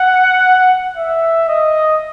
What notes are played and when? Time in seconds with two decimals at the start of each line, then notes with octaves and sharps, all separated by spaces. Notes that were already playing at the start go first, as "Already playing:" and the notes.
Already playing: F#5
0.97 E5
1.49 D#5